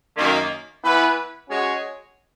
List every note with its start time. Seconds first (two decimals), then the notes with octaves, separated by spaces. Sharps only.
0.15 F#2 D#3 A#3
0.83 E3 B3 E4 B4
1.49 G#3 C#4 F#4 C#5